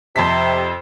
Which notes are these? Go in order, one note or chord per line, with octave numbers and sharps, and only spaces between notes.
F2 C3 C5 A5 B6